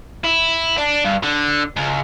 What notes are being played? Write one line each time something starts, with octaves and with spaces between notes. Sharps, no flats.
E4
D4
G2
D3
C#2